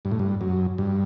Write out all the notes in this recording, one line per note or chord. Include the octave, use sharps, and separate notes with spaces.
G2
A2
G2
F#2
G2